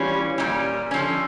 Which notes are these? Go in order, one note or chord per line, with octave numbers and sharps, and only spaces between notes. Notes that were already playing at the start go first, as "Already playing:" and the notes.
Already playing: E3 G3 C#4 F4
A#2 G3 C#4
D3 F3 C#4